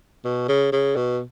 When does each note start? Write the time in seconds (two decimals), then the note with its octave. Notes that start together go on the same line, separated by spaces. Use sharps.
0.25 B2
0.48 C#3
0.72 C#3
0.96 B2